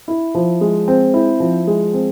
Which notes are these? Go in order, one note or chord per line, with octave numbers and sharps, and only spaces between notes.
E4
F3
G#3
C4
E4
F3
G#3
C4